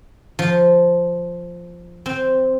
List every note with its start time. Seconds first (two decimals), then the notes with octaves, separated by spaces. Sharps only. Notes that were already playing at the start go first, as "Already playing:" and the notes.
0.39 F3
2.06 C4